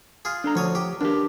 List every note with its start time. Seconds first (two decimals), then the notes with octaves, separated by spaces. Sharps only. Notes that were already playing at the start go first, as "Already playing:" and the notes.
0.25 F4 G#4
0.44 D4 A4 A#5
0.55 D2 F3 C#5 D#6
0.75 G4
1.01 D#2 D4 G4